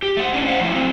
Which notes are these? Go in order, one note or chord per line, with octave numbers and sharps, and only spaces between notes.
G4
A3 F#5
A2 C#4 D4
C5 F5 F#5
F3 A3 E4 E5 F5
F#3 C4